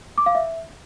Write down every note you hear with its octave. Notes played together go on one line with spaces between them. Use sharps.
D6
F5
E5